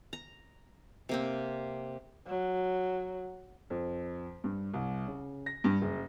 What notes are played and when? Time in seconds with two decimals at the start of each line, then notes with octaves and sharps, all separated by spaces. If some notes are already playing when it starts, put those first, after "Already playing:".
0.13 A#5
1.09 C3 A#3 C4
2.27 F#3
3.70 F2
4.44 G2
4.74 C2
5.07 C#3
5.46 A#6
5.64 G2
5.82 F#1